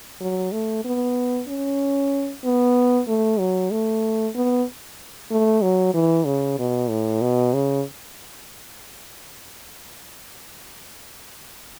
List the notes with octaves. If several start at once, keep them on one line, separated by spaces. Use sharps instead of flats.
F#3
A3
B3
C#4
B3
A3
F#3
A3
B3
A3
F#3
E3
C#3
B2
A2
B2
C#3